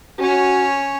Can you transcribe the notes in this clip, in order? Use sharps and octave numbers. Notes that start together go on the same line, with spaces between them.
C#4 F#4 C#5